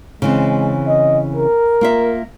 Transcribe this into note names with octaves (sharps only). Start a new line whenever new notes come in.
C#3 E3 G#3 C4
D#5
A#4
A#3 F4 E5